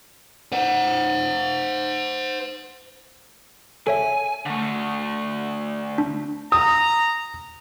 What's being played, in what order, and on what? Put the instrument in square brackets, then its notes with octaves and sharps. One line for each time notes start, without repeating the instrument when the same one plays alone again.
[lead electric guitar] C5 F#5
[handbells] A4 C#5 E5 [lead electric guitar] G#5
[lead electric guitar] D3 A3
[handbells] D4
[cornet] A#5 [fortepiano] D#6